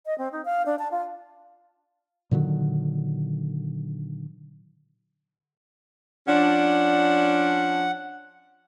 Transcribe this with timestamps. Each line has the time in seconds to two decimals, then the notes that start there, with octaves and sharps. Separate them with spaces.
0.06 D#5
0.18 C4
0.32 D#4
0.45 F5
0.66 D4
0.79 A5
0.91 F4
2.31 A#2 D3 D#3 F#3
6.28 F3 C#4 D4 F#5